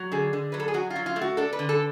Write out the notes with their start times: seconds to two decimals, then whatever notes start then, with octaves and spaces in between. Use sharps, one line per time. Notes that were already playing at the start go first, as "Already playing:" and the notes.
Already playing: F#3
0.12 D3 G#4
0.33 D3
0.52 F#3 B4
0.60 A4
0.68 G#4
0.74 F#3 F#4
0.90 F4
0.96 F#3
1.06 F4
1.16 A3
1.21 F#4
1.37 D4 A4
1.53 B4
1.59 D3
1.69 A4